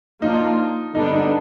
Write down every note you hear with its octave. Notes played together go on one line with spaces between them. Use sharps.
F3 A#3 D4 D#4 F4
D3 G3 B3 D4 D#4
D#4